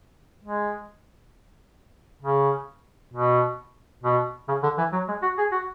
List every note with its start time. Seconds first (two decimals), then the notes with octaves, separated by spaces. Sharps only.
0.44 G#3
2.23 C#3
3.14 B2
4.03 B2
4.48 C#3
4.63 D3
4.78 E3
4.92 F#3
5.08 G#3
5.23 F#4
5.38 G#4
5.52 F#4